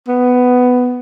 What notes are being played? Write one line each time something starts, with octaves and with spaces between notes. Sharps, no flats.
B3